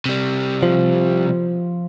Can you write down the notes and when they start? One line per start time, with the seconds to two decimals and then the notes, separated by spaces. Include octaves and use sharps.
0.06 C3 G3
0.63 F3